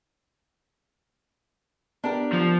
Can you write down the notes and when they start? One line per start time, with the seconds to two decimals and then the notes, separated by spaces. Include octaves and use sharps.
2.04 B3 D4 G4 A#4
2.33 F3